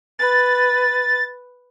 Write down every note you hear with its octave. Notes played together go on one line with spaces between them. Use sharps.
B4 A6